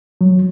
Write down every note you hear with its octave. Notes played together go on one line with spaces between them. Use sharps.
F#3